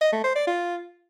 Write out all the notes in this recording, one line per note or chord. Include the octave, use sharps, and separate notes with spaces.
D#5
A3
C5
D5
F4